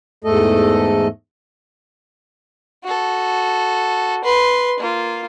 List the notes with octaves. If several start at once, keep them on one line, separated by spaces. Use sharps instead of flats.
E2 G#2 A3 A4 D#5
F#4 A4
B4 C6
A#3 F4